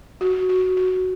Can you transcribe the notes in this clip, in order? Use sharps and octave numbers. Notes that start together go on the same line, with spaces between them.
F#4
F#4
F#4